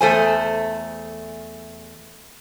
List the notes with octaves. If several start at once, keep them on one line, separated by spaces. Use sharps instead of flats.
E2 A3 C5 G#5